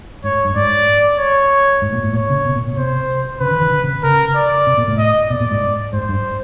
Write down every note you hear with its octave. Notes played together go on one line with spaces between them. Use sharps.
G#2 C#5
G2
G#2 D5
C#5
G#2
A#2
A2
A#2 C#5
C#3
B2
A#2
B2
C3 C5
C#3 B4
D#3
D#3
D3
C3
C#3
C#3 A#4
D5
C3
A#2
A2
D#5
B2 D5
A#2
G#2
G#2 C5
G2